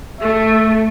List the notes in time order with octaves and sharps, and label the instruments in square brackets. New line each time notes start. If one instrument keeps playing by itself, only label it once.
[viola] A3 [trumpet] E5